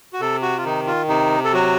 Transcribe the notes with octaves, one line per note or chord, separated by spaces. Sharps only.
F#4
C3 A4
F#4
F4
D#3 D#4
F4
C3 D#4
A4
F#3 F#4